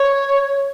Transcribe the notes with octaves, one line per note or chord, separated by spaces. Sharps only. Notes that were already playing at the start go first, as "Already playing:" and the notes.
Already playing: C#5